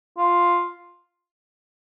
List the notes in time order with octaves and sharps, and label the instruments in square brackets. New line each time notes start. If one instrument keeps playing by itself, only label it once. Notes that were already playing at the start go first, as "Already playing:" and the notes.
[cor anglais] F4